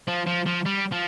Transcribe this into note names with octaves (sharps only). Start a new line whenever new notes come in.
F3
F3
F3
G3
F3